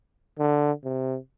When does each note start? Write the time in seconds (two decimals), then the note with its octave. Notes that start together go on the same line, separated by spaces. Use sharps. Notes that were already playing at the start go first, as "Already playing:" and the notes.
0.39 D3
0.85 C3